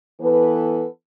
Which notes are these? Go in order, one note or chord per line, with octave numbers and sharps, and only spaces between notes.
E3 B3 A4 B4